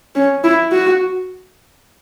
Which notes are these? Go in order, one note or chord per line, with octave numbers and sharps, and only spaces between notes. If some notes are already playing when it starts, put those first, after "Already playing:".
C#4
E4
F#4